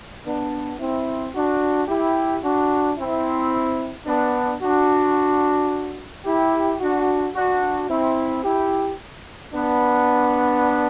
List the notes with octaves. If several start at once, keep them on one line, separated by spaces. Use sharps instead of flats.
B3 D4
C4 E4
D4 F#4
E4 G4
D4 F#4
C4 E4
B3 D4
D4 F#4
E4 G4
D4 F#4
D4 F#4
C4 E4
E4 G4
B3 D4